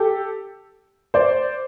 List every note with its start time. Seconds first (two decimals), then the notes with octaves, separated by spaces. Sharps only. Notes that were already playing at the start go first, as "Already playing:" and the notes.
Already playing: G4 A4
1.14 C5 D5